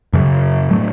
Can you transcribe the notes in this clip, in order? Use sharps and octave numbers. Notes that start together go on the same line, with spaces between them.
F#2 C#3 F#3
A2 F#3 A3